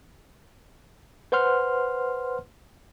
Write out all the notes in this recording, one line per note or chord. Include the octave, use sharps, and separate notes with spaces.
B4 C5 F#5 C6 F6